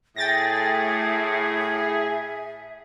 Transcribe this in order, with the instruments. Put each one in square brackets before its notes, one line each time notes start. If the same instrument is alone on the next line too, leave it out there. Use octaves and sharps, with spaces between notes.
[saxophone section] A2 [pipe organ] G#4 [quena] E5 [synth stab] G5 A6 A#6